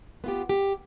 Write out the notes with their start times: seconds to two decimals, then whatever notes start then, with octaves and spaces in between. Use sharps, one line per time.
0.24 B3 F4 G4
0.49 G4